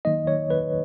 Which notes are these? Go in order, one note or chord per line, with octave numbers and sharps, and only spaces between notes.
D#3 F#3 A#3 D#4 D#5
C#5
B4